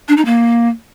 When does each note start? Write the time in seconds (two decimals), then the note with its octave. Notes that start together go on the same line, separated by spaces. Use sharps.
0.08 D4
0.17 D#4
0.25 A#3